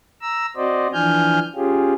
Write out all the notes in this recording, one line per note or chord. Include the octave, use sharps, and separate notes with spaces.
A#5 E6
C4 F#4 C5 D5 D#5
E3 F3 D4 G#5 F6 G6
C#4 F4 G4 G#4